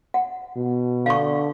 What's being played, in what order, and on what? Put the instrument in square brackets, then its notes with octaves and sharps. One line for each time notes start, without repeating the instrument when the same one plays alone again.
[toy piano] F#5
[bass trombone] B2
[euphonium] D3 [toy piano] F5 C#6